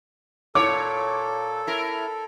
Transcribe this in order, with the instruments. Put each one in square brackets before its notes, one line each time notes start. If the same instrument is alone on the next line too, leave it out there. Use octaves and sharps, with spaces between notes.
[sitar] A#2 C#5 [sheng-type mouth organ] A4 [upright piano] D6
[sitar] E4 A#4